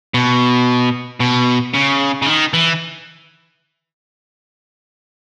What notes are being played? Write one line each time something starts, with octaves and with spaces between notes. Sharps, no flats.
B2
B2
C#3
C#3
D#3
E3